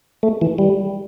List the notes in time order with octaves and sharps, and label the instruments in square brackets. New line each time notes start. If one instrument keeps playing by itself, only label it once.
[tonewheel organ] A3
E3
G3